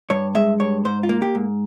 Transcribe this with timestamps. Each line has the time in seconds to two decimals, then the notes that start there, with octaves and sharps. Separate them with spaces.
0.10 G2 C#5
0.35 G#3 E5
0.60 G2 C#5
0.85 G#2 C5
1.03 F4
1.09 A#3
1.22 G4
1.35 G#2